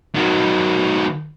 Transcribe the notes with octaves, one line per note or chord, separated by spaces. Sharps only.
D#3 F#3